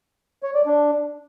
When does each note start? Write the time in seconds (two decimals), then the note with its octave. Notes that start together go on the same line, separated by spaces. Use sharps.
0.43 C#5
0.55 D5
0.66 D4